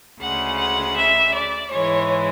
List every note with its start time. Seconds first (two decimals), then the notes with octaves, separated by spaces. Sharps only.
0.20 D2 C#3 G#3 F#5
0.58 F#5
0.96 E5
1.34 D5
1.71 G#2 E3 G#3 C#5